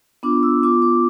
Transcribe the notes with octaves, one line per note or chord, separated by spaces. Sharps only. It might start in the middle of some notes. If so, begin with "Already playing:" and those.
B3 D4 F4 D6
E6
B3 F4 D6
D6